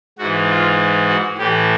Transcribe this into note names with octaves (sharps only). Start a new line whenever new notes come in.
G#2 E3 F#4
F4
F#4
A2 E3 G4